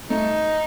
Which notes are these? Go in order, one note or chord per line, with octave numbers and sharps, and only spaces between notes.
A3 D#4